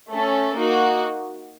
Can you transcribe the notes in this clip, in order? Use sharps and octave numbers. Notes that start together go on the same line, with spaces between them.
A3 C#4 A4
A#3 D#4 F#4